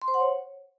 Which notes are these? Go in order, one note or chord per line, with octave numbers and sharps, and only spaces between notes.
C6
C5
F#5
C#5